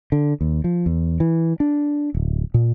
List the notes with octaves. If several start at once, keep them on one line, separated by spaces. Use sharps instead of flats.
D3
D#2
F3
E2
E3
D4
D1
A#2